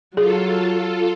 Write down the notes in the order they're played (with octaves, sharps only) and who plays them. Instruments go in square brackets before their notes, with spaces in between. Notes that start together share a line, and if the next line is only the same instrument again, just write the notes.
[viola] F#3 [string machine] F4 A4 [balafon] G#4